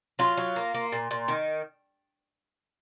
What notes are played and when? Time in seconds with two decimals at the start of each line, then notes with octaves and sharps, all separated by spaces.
0.19 F#3 F4
0.37 F#3
0.56 A#3
0.74 A#3
0.92 A#2
1.11 A#2
1.28 D#3